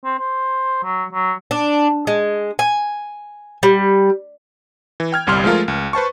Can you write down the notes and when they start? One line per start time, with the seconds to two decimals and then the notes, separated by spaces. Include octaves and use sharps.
0.04 C4
0.19 C5
0.84 F#3
1.13 F#3
1.51 D4
2.07 G#3
2.59 G#5
3.63 G3
5.00 E3
5.12 G5 F6 G#6
5.27 G1 C2 G3 C6 F6
5.44 F3 G#3 A3 F4 A#4
5.68 C#2
5.93 B4 C5 A5 C#6